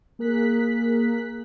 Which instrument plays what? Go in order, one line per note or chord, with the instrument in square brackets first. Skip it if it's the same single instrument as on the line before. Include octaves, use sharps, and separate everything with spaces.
[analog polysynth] A#3 G#4 A#4 F#6 B6